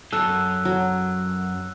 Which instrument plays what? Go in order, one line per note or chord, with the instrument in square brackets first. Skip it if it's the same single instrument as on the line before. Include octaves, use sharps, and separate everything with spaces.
[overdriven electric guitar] F#2 [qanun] A4 [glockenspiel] E6 F#6
[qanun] F#3